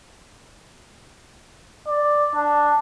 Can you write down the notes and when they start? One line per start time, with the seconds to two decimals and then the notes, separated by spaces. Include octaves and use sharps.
1.88 D5
2.35 D4